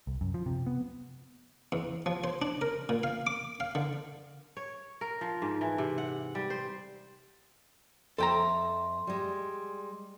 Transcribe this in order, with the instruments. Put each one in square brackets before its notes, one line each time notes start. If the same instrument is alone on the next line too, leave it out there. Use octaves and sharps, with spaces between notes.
[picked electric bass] C2
F#2
F3
C3
B3
[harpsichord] E2
F3
C5
D4
A#4
A#2
F5
D6
F5
D3
[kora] C#5
A#4
F3
G#2
E3
C3
F#5
G3
C5
[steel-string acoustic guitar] F2 E5 [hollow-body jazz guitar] A4 G5 A#5 [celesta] C6
[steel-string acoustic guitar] G3 G#3